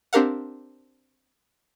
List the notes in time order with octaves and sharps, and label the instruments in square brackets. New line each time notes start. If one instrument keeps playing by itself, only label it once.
[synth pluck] C4 D4 G4 A#4 F5 F#5